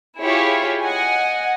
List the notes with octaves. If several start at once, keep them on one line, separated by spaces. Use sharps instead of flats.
E4 F4 G4 G#4 C#5
D#5 F#5 G#5